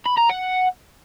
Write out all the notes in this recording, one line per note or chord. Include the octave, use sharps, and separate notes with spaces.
B5
A#5
F#5